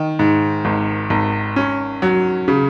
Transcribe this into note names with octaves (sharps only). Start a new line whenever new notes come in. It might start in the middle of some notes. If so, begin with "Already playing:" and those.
Already playing: D#3
G#2
G#1
G#1
C#4
F#3
C#3